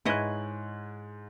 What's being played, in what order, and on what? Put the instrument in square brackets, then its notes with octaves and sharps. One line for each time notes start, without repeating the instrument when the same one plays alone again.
[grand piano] G#2 G#5 F#6 [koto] E4 C#5 D#5